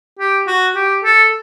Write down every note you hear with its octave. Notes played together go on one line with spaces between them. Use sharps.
G4
F#4
G4
A4